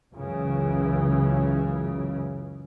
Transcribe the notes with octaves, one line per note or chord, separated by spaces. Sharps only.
C#2 F#2 C#3 E3